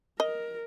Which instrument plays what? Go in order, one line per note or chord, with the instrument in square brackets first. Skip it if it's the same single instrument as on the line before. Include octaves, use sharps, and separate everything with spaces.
[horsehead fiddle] A#4 [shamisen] D#5